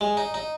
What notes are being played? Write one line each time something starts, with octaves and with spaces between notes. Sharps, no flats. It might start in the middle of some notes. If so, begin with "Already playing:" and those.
G#3
D#4
D#4